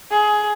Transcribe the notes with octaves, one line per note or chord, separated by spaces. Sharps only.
G#4